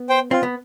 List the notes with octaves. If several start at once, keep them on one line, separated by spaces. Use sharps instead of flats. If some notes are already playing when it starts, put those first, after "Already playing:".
Already playing: B3
C5 G5
C4 F4
B3